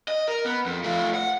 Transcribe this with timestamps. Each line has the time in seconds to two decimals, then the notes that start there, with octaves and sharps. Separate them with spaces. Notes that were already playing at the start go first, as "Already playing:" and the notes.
0.08 D#5
0.28 A#4
0.45 B3
0.66 F2
0.84 A3 F4
1.14 F#5